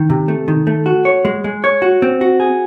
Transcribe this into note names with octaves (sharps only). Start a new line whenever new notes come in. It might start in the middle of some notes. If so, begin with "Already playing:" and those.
Already playing: D#3
C3
A3
D#3
A3
F#4
C#5
G#3
G#3
C#5
F#4
C4
F#4
G#4